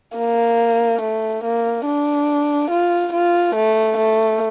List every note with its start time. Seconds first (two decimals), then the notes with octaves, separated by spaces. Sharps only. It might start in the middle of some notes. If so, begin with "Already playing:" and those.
0.17 A#3
1.01 A3
1.43 A#3
1.86 D4
2.70 F4
3.13 F4
3.55 A3
3.97 A3